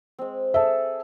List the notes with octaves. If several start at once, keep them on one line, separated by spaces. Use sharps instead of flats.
G#3 C4
G#4 A4 E5